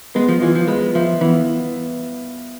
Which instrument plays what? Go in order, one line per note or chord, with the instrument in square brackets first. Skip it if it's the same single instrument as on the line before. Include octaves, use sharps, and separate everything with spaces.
[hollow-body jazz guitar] G#3 [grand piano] B3
[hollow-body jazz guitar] F3
[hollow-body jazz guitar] E3 [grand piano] F4
[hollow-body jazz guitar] F3
[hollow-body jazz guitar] G#3 [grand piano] B4
[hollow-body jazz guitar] F3 [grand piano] E5
[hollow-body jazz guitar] E3 [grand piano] B3